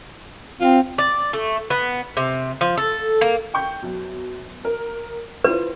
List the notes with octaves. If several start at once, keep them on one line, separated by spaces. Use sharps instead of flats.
C4 F4
D5
A3
B3
C3
F3
A4
A#3
G5 C#6 G6
F#2 B2
A#4
E4 F4 B4 C5